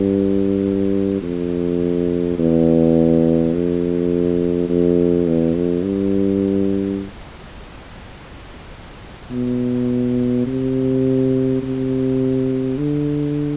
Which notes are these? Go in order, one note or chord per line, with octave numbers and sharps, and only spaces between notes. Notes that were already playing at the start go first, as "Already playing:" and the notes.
Already playing: G2
F2
E2
F2
F2
E2
F2
G2
B2
C3
C3
D3